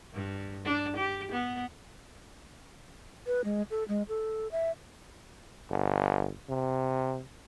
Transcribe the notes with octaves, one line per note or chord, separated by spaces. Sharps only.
G2
D4
G4
B3
B4
G#3
A4
G#3
A4
E5
G1
C3